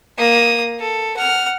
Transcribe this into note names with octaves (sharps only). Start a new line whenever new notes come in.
A#3 D#6
A4
F#5 F6